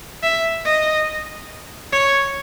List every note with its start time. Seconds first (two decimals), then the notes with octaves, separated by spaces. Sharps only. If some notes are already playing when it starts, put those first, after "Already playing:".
0.23 E5
0.65 D#5
1.92 C#5